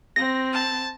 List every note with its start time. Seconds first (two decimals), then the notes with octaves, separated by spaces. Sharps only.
0.16 C4 A#6
0.53 A5